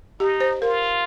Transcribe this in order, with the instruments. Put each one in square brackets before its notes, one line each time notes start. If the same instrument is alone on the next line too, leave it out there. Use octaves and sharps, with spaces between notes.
[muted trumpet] D#4 [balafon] G4
[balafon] C5
[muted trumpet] F4 [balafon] A#4